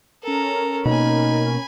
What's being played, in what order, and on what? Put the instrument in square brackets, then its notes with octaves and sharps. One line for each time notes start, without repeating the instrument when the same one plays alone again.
[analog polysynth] C#4 A#4 [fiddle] A4 A#5
[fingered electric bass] B2 A#3 [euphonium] D#4 [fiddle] G#5 B5